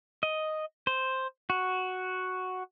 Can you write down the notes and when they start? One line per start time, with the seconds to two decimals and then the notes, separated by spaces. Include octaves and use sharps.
0.23 D#5
0.87 C5
1.50 F#4